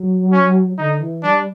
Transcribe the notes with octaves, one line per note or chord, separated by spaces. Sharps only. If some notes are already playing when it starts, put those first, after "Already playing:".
Already playing: F#3
C#4
D3 D#4
E3
G3 D4